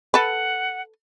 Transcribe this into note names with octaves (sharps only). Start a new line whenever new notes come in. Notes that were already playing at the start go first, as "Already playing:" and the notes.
A4 B4 F#5